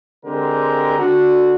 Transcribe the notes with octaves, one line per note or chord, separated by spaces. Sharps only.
D3 G#3 C4 G4 A#4
D3 D4 F#4